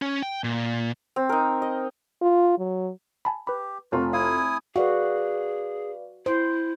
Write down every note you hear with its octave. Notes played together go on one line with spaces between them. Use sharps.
C#4
G5
A#2
C4
D#4 A#4
D#5
F4
F#3
G#5 A5 B5
G4 B4 B5
F1 F4 F#4
E4 F5 G#5 D#6
F#4 G#4 B4 D5 F5
E4 C5